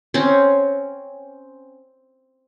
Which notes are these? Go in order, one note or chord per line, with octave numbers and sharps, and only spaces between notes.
C4 C#4